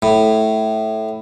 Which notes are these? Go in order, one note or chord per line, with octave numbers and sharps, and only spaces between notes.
A2